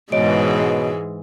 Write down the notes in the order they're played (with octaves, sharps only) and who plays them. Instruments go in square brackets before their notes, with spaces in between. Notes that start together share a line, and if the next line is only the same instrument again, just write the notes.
[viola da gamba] G#2 E3 G#3 [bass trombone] B2 [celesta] C#5 D#5 D7